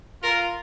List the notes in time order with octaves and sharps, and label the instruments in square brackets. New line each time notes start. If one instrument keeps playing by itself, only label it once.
[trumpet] F4 [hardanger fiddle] A#4